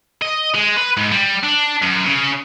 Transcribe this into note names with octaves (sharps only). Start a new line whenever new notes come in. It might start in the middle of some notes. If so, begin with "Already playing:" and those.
D#5
G#3
B4
G#2
G3
D4
F#2
C#3